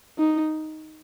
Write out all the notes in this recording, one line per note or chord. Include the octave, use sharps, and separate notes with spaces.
D#4